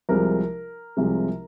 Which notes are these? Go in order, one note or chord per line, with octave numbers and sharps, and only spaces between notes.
C2 C3 F3 G#3 A#4
C2 C3 F3 G#3